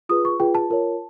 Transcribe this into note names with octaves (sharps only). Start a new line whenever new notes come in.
F4 G#4 B4 D#6
C#6
F4 G#4 B4 G5
A5
F4 A#4 C#5